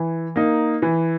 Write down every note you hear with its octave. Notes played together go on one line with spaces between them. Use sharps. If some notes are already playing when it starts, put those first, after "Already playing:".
Already playing: E3
A#3 D#4
E3